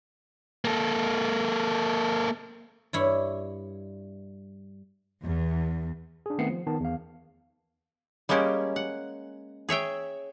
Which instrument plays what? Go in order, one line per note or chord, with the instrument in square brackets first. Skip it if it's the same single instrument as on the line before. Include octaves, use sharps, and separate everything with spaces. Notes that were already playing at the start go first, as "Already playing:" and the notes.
[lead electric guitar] A#3 A4
[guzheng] G2 E4 C#5
[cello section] E2
[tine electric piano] D4 G#4
D#3 A3 B3 C4 C7 C#7
F3
D#3 B3 A5
E2 F5
[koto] G3 G#3 A#3 C#4 G4
F#5
G#4 C#5 E5 G5